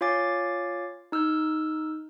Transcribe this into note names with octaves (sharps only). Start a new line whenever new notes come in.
F4 C#5 F5 G#5 D6 A6
D#4 E6 F6 G6